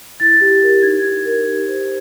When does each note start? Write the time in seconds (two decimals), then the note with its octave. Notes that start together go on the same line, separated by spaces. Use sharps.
0.20 E4 A6
0.41 G4
0.62 A#4
0.83 D#4 G#6
1.04 G4
1.25 A#4
1.46 G4
1.67 C5